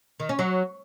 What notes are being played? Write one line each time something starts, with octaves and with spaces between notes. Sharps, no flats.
D#3
C#4
F#3